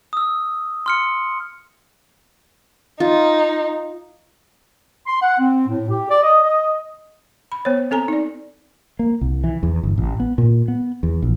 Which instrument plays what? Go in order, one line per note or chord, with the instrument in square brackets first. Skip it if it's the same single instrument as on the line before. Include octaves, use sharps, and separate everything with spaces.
[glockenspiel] D#6 E6
C6 F6 C#7
[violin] D#4 [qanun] F4
[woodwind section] C6
F#5
C4
A2
G4
D5
D#5
D#5
[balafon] B5
B3 C5 C#5
C4 A4 G#5 A#5
D#4 D5
[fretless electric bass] A#3
C2
E3
E2
G1
A1
B3
A#2
B3
E2
A#1